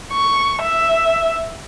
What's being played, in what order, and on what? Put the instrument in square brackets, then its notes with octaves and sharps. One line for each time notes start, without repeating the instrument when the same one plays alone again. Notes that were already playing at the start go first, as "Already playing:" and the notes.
[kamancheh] C#6
E5